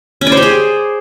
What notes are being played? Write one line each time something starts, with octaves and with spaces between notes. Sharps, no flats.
C#4
D5
C5
G4
G#4